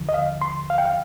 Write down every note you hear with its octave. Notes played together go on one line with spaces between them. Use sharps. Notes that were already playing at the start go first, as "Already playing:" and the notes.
Already playing: D#2 D3 F3
D#5
F5
C6
F5
G5
F5